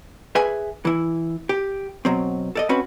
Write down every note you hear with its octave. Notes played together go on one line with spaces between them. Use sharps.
G#4 B4 E5 G#5
E3 E4
G4
B2 F#3 C4
A4 D5 D#5
C4 C#4 F#4 B4 B5